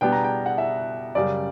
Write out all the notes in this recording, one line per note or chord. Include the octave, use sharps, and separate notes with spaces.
B2 G3 B3 D4 G5
A#5
G5
F#5
E5
F#2 C#3 G3 D5